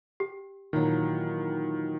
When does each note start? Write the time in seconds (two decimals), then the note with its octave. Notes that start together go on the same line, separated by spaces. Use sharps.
0.20 G4
0.73 A#2 D#3 E3 F#3